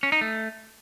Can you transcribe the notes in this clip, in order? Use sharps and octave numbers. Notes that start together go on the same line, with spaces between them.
C#4
D#4
A3